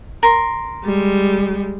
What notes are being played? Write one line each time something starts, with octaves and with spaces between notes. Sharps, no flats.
A#4 C6
G3 G#3